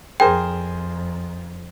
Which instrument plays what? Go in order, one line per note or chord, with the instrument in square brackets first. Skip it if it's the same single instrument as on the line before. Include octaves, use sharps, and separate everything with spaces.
[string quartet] F2 [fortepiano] G#4 A#4 C5 [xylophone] G5